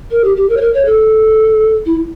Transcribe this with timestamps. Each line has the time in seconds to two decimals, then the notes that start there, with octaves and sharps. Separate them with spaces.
0.11 A#4
0.24 G4
0.36 G4
0.49 A#4
0.56 C#5
0.61 A#4
0.73 C#5
0.85 A4
1.85 E4